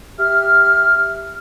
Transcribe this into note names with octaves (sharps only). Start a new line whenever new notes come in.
G4 E5 F6